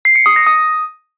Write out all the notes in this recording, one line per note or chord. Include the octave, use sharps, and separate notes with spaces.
C7
C#7
D#6
A#6
D#6